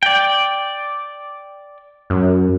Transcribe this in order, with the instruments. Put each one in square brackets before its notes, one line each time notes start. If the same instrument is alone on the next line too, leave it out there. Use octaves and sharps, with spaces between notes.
[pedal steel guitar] D5 G5
[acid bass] F#2